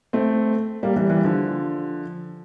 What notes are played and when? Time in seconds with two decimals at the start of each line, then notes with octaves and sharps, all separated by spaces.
0.13 A3 C4
0.83 G3 A#3
0.96 E3 G3
1.10 E3 G3
1.24 D3 F3